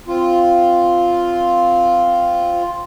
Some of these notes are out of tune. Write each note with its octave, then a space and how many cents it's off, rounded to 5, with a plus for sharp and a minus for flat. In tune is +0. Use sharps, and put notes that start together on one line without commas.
C4 -5 F4 +0